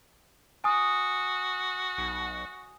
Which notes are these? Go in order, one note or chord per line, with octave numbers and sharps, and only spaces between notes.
F#4 G#5 D#6
B1